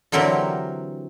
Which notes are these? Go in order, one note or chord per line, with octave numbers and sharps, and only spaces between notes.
D3 E3 F#3 C4 G4 A#4